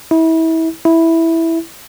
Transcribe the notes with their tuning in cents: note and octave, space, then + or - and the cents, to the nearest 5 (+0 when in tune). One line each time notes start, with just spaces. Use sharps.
E4 -30
E4 -5